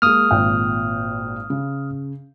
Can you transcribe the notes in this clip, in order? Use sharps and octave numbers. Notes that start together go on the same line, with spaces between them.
G#3 A#3 D#6 F6
G#1 A#2 G5
C#3